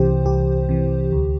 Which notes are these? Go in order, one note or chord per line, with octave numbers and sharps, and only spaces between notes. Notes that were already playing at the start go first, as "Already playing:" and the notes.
Already playing: C2 C3 E3 G4 C5
C2 G4
C3 E3
D2